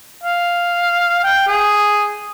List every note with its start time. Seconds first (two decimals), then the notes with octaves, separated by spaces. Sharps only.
0.24 F5
1.24 G5
1.47 G#4